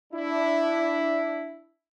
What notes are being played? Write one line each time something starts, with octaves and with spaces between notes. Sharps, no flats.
D4 E4